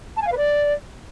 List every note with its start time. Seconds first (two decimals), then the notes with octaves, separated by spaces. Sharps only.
0.16 A5
0.21 G#5
0.26 F5
0.31 B4
0.37 D5